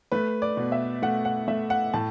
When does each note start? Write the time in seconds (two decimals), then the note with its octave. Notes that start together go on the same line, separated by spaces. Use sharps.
0.12 A3 B4
0.42 D5
0.57 B2
0.72 E5
1.02 A3 F#5
1.25 F#5
1.48 A3 E5
1.70 F#5
1.94 A2 A5